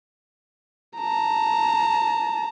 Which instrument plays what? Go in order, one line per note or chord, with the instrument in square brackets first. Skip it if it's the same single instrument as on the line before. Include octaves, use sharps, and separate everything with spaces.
[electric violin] A5 A#5